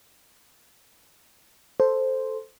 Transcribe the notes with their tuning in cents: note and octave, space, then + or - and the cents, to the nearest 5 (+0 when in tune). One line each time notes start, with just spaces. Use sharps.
A4 +0 C5 +0